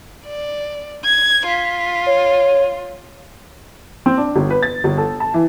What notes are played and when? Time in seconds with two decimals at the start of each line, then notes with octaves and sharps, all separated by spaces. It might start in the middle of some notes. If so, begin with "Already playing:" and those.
0.26 D5
1.05 G#6
1.47 F4 B6
2.07 C#5
4.06 C4
4.17 D4
4.36 G1
4.50 B4
4.63 A6
4.84 G1
4.98 A4
5.20 A5
5.34 E3